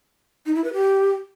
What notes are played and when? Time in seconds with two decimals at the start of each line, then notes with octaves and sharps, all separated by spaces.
0.46 D#4
0.55 E4
0.64 B4
0.73 G4